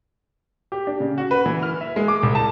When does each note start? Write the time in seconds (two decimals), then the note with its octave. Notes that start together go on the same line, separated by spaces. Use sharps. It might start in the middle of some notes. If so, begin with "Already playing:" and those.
0.72 G4
0.87 D4
1.00 C#3
1.18 F#4
1.31 B4
1.46 E3
1.63 F6
1.81 E5
1.96 G#3
2.08 D6
2.23 C2
2.35 A5